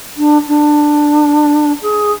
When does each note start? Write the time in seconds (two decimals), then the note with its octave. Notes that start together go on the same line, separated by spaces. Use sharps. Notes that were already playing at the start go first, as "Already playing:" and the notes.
0.16 D4
0.47 D4
1.81 G#4